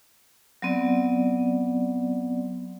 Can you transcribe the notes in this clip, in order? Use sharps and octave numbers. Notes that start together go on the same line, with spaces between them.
F#3 B3 C4 D5